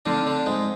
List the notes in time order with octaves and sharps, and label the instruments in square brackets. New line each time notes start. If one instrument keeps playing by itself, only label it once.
[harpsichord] D3 D4 [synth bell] F3 A3 C4 D#4
[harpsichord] D3 D4
G#2 G#3